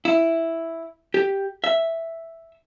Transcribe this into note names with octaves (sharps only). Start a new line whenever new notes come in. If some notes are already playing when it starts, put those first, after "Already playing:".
E4
G4
E5